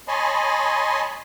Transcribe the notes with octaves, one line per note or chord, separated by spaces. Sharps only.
C#5 D#5 G#5 A5 B5 C6